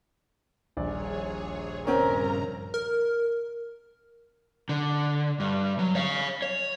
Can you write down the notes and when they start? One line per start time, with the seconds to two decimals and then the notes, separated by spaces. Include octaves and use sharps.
0.77 D#1 A#1 G#4 C#5 D5
1.87 G2 C#3 C4 C#4 A#4 A#5
2.74 A#4
4.69 D3
5.40 G2
5.79 F#3
5.95 C#5 F5
6.42 C#5